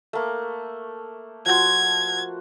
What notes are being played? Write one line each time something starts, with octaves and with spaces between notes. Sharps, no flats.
A3 A#3
F3 F#4 C6 G#6